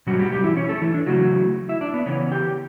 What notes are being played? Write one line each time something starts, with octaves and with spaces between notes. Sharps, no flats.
B2 F#3 G3 C#4 F#4
G3 G4
G3 G4
E3 E4
C#4 C#5
A3 A4
E3 E4
D4
C#3 E3 F#3 A3 C#4 F#4
E4 E5
D4 D5
B3 B4
C#3 E3 B3 C#4 C#5
G4 G5